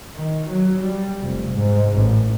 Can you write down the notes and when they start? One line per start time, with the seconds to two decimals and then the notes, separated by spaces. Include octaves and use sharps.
0.15 D#3
0.50 F#3
0.81 G3
1.22 F1
1.53 G#2
1.96 A1